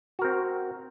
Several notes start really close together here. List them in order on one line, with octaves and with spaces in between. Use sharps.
F#4 A#4 C4